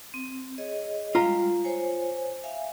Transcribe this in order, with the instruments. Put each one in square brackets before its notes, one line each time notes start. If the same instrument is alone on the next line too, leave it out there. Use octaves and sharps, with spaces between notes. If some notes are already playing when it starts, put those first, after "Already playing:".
[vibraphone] C4
G#4 C#5 D#5
[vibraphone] G3 G#3 [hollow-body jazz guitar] F4 A#5
[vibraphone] C5 C#5 G#5
E5 F5 G#5